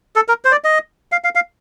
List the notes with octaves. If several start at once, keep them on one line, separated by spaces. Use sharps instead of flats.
A4
A#4
C5
D5
D#5
F5
F5
F5